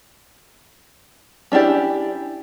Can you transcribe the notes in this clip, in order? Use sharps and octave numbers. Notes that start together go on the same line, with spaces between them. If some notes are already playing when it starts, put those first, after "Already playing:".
C#4 D4 E4 G4 D5